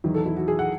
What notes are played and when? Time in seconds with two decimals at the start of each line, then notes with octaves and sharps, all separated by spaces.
0.04 E2 D#3 F#3
0.14 A4
0.26 E4
0.37 F#4
0.48 G#4
0.59 F#5